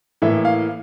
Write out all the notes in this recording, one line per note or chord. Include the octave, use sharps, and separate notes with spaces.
A2 E3 A#3 E5
F5